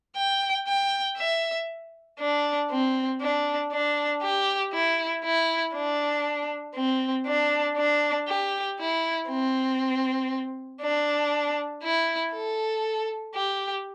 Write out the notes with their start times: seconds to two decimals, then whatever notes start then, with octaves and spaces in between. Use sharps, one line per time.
0.16 G5
0.67 G5
1.18 E5
2.20 D4
2.70 C4
3.21 D4
3.72 D4
4.22 G4
4.73 E4
5.24 E4
5.75 D4
6.75 C4
7.27 D4
7.77 D4
8.28 G4
8.78 E4
9.29 C4
10.81 D4
11.83 E4
12.33 A4
13.35 G4